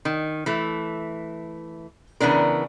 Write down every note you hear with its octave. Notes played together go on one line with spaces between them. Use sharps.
D#3
E3 A3
C#3 E3 B3 D4 A#4